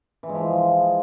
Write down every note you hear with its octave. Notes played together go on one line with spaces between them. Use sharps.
E3
G#3
F3